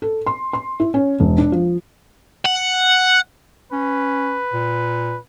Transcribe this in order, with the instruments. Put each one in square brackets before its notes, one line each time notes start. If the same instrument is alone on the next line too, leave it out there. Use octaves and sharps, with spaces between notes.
[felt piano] A4
C6
C6
E4
C#4
E1
D4
F3
[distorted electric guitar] F#5
[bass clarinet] C#4 [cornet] B4
[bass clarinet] A#2